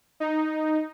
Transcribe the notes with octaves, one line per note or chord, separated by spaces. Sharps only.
D#4